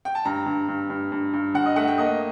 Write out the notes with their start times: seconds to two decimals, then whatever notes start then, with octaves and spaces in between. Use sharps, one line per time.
0.05 G5
0.15 A5
0.25 G2 A#5
0.46 G2
0.68 G2
0.90 G2
1.12 G2
1.33 G2
1.54 G2 F#5
1.66 D#5
1.76 A3 F#5
1.87 G5
1.98 A#3 D#5